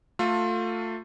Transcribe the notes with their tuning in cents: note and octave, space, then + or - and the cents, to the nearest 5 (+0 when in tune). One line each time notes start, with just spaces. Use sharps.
A3 +25 F4 +20 A4 +20